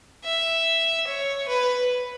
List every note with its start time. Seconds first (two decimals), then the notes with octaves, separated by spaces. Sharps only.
0.25 E5
1.07 C#5
1.48 B4